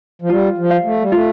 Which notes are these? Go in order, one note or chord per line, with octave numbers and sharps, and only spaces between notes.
F3
G3 F4
F3
F5
A3
G3
A3 F4